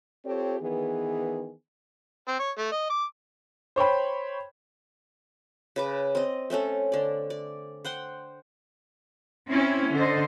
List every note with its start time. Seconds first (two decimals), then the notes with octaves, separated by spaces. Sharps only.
0.25 C4 F4 G4 A4 C#5
0.60 D#3 E3 B3 G#4
2.28 C4
2.39 C#5
2.58 A3
2.72 D#5
2.90 D6
3.76 C5 C#5 G5 B5
5.76 C#3 B4 D6
6.15 C4 D#5
6.50 A3 C4 C#4 A4
6.92 D3 D5
7.30 D5
7.84 C5 F#5 G5 C6
9.48 C4 C#4 E4
9.92 D3 C5 D#5